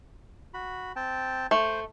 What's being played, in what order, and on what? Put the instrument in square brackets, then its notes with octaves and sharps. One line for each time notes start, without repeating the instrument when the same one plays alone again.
[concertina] F#4 B5
C4 G5 A5
[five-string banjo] A3 [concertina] C5